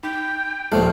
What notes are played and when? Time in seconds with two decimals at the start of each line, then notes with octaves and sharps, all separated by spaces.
0.03 D#4 G5
0.72 D#1 A#1 A#2 F3 A4 E5 F5 A5